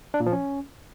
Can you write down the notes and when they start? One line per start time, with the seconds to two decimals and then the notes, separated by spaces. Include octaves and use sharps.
0.14 D4
0.20 A#2
0.26 F3
0.32 C#4